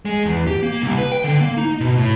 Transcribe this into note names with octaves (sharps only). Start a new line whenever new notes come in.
G#3
E2
G4
A#3
C2
B4
G5
D3
A#3
D#4
B2
A2